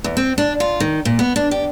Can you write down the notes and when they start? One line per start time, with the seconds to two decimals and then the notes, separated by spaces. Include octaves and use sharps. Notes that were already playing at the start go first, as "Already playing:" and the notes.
0.04 E2
0.17 C4
0.38 D4
0.60 F4
0.80 D#3
1.05 A#2
1.19 B3
1.36 D4
1.51 G4